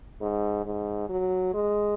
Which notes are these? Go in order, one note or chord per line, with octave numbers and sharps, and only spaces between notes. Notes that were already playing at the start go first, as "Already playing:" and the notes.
G#2
G#2
F#3
G#3